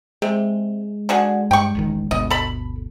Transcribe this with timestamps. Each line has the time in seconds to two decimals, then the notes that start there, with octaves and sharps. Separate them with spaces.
0.22 C3 G#3
1.09 D3 F#4 G#4
1.51 G2 G5 C#6
1.75 E1 A1 D#3
2.11 G1 D2 B2 D#5
2.30 A4 B5